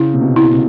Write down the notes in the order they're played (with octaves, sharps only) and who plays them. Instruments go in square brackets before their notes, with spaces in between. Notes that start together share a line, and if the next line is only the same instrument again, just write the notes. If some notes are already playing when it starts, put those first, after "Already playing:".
Already playing: [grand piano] C#3 [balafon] E4
[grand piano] C3
B2
[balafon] E4
[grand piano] C3